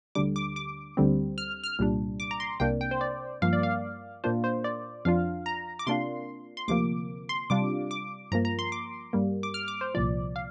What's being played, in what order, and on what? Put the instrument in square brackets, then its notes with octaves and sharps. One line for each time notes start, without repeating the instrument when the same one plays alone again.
[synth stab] D2 D3 G3 D6
D6
D6
D2 D3 G3 C4
F6
F6
C2 A#2 G3 D4
D6
A#5
C6
C2 C3 A#3 D4 G5
G5
C5
D5
G2 F3 A#3 F5
D5
F5
A#2 A#3 D4 F4 C5
C5
D5
F2 F3 D4 F4 F5
A#5
D6
C3 A#3 D4 F4 C6
C6
D2 C3 F3 A#3 D6
C6
C3 G3 D4 F4 D6
D6
G2 F3 A#3 A#5
A#5
C6
D6
G2 G3 A#3
D6
F6
D6
C5
C2 A#2 F3 D5
F5